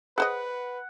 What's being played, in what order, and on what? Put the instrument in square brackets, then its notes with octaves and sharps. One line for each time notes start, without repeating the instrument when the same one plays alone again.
[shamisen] G#4 C5 D#5 [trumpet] B4 [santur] F#5